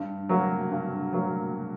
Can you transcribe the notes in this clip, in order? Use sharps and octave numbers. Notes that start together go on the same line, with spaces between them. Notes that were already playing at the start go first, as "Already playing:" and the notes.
Already playing: G2
F#3 A#3
G2
F#3 A#3